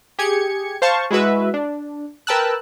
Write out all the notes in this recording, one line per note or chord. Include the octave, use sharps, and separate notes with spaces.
G4 G#4 G#6 C#7
C5 F5 A5 C#6
G#3 E4 F#4 B4 E5
D4
A#4 B4 G5 A5 E6 F#6